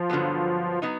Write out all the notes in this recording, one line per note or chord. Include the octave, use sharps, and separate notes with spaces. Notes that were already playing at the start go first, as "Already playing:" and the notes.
Already playing: F3
G2 D3 F#3 B3
F#3 B3 D#4